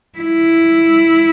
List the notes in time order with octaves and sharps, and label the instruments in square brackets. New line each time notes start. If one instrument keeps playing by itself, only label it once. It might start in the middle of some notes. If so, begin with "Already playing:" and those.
[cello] E4